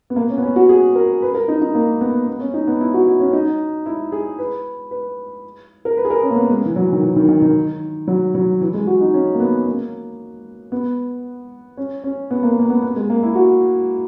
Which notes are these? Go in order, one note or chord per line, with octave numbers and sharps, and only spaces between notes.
B3
A#3
C#4
B3
C#4
F#4
G#4
A#4
B4
A#4
D#4
D#4
A#3
B3
B3
C#4
D#4
B3
E4
F#4
E4
C#4
D#4
E4
G#4
B4
B4
A#4
B4
G#4
A#4
C#4
A#3
B3
G#3
E3
F#3
D#3
E3
D#3
D#3
D#3
F#3
F#3
E3
G#3
F#4
D#4
C#4
A#3
B3
A#3
B3
C#4
C#4
B3
A#3
A#3
B3
B3
G#3
A#3
E4
F#4